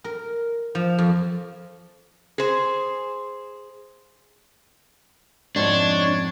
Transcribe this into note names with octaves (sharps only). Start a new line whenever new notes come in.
A#4
F3
F2
G#4 C5
F2 G#2 D4 C#5